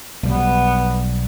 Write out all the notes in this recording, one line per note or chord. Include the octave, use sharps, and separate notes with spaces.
B1 G3 B3